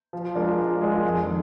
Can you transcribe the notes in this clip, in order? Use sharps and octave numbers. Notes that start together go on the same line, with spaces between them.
F3
G#3 D4 F4 A#4
F3
G#3 D4 F4 A#4
F2
D#3